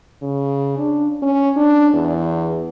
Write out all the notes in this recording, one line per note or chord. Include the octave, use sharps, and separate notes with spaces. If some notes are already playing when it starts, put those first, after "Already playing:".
C#3
D4
C#4
D4
E2